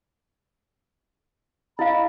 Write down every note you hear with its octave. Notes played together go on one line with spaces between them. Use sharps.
E4 D#5 F5 B5